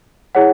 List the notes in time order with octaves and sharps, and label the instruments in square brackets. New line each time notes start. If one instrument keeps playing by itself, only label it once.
[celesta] E4 G#4 C#5 F#5